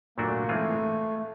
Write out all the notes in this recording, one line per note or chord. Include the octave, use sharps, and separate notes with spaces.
A#2 F#3 A3 A#3 D4 F#4
E3 G#3 A3 C4 F4 G#4